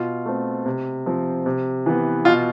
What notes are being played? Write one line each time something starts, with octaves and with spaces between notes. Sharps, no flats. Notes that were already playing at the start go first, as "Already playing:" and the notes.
Already playing: B2 F4
A3 C4
C3
F3 C4
C3
E3 B3
B2 F4